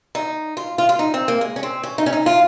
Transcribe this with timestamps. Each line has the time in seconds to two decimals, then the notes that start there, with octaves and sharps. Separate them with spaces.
0.15 D#4
0.57 F4
0.78 F4
0.89 F4
0.99 D#4
1.14 C4
1.28 A#3
1.41 G#3
1.56 C#4
1.63 C4
1.83 C#4
1.98 D#4
2.06 C#4
2.13 D#4
2.26 F4